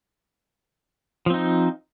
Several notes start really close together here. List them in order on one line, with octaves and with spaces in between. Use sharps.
F3 C4 D#4